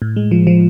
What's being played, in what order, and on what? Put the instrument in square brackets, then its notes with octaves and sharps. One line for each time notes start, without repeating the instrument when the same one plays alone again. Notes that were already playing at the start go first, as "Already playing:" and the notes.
[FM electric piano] A2
G#3
F3
F3